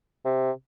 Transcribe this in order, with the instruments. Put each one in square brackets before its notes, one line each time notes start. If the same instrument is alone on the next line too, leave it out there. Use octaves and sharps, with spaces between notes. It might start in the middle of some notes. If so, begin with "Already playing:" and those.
[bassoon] C3